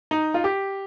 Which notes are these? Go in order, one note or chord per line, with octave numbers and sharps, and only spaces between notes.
D#4
F4
G4